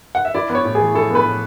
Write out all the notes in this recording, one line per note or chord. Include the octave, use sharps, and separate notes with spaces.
F#5
E5
E4 D5
B3
C#5
A2
G#4
E3
E4 A4
B3 B4
A2